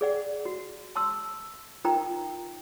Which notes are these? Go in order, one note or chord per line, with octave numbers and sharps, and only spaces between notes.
G#4 D5 F#5
F#4
A5 C6 E6
D#4 F4 A#4 G5 A#5